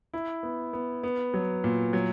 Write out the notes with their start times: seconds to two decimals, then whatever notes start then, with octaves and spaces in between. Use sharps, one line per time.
0.14 E4
0.43 B3
0.73 B3
1.03 B3
1.34 F#3
1.64 A#2
1.93 F#3